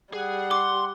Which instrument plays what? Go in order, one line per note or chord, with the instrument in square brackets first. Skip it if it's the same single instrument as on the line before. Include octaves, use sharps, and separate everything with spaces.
[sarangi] G3 [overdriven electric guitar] G#4 [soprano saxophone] F#5
[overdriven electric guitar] C6 [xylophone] D6